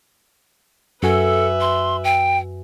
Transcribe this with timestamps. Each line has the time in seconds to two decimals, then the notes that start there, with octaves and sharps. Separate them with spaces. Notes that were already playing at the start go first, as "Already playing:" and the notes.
1.03 F#2 F#4 A4 B4 E5 G#5
1.61 C6
2.04 G5